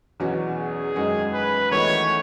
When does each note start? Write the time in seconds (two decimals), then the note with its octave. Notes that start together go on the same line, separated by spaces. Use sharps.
0.20 E2 B2 F#3 C#4 F#4
0.58 G#4
0.96 F#2 D#3 G#3 C#4 F#4
1.33 B4
1.71 E2 D#3 A3 D#4 F#4 C#5